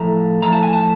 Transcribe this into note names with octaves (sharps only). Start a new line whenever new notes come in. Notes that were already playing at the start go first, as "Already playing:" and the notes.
Already playing: A2 F3 A3 A#5
A2 F3 A3 A#5
A5
G#5
A5